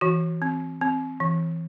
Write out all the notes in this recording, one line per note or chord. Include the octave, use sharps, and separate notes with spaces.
E3 F#4
C4
C4
E3